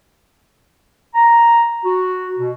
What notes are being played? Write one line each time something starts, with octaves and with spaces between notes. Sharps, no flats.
A#5
F#4
B2